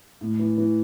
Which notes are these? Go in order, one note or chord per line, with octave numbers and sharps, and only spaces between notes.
A2
E3
E3